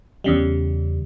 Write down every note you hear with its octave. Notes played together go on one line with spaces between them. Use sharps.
E2 C#3 G3